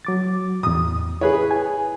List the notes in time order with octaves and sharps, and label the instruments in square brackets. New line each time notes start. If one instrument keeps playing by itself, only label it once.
[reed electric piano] F#3 D6 A6
[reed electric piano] E2 A2 [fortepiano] D#6
[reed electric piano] E4 [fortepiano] G#4 B4 C#5
[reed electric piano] G#5